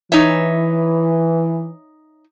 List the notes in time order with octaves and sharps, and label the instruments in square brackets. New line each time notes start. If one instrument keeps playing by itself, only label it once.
[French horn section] E3 [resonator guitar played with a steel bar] D#4 C#5 E5